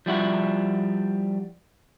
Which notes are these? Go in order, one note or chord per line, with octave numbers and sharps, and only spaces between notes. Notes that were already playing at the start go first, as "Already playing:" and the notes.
F3 G3 E4 F#4